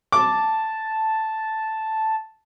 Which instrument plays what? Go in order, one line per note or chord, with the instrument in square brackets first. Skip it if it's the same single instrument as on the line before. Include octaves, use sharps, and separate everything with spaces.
[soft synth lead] A5 [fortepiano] D6